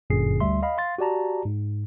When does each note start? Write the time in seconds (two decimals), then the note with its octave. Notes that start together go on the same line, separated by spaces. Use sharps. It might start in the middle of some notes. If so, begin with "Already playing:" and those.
0.10 G1 F#2 A#2 D3 G#4 C7
0.40 D2 G3 E5 C6
0.63 D#5 F5 B5
0.78 F5 C6 A6
0.98 F#4 G4 D5 A5 A#5
1.45 G#2